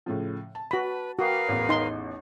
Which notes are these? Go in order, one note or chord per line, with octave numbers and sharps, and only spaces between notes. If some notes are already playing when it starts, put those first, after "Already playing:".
A2 C#3 F3
A5
F#4 B4 B5
F#4 A#4 B4 F5 G5 D6 D#6
A1 E2
D#4 C6